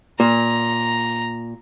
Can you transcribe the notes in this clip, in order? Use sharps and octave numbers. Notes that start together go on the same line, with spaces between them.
A#2 A#5